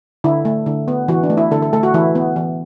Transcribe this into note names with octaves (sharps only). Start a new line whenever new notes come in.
D3 E4
A3
D3
B3
E3 F#4
D4
A3
E4
D3 A4
A4
A3 A4
F#4
E3 E4
B3
E3